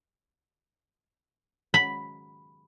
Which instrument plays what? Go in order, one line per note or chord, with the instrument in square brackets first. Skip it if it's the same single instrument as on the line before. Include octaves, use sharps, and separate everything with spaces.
[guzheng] B5